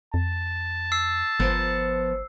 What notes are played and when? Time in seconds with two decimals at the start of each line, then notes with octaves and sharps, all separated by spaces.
0.14 F2 A5
0.92 E6 C7
1.40 G1 F3 B3 A#4